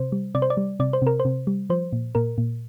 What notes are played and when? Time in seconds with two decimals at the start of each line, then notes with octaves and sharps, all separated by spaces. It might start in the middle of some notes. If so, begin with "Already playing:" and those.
Already playing: C3 C5
0.12 G3
0.35 C3 D5
0.42 C5
0.50 D5
0.57 G3
0.80 C3 D5
0.93 C5
1.02 C3 A#4
1.20 C5
1.25 C3
1.47 G3
1.70 F3 C5
1.93 A#2
2.15 A#2 A#4
2.38 A#2